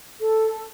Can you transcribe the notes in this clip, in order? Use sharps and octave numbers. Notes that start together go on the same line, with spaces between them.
A4